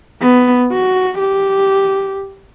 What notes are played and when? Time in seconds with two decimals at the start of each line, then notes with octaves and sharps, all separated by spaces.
0.22 B3
0.72 F#4
1.19 G4